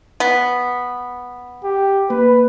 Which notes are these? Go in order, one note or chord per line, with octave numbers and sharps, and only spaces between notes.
B3
G4
A#3 B4